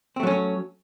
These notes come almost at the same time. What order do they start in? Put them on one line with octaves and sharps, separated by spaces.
C4 A3 F#3 C#4